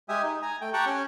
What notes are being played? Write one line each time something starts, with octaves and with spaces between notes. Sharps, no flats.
G#3 G4 E5 G#5 D#6
D#4
G#5 A#5
A3 G5
G4 G5 A5 A#5 C#6 F#6
C#4